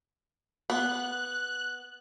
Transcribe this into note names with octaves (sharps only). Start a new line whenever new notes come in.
B3 F#6